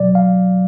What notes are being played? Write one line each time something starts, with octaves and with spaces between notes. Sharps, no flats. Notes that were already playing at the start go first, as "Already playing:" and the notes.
Already playing: B2 F#3 D5
F5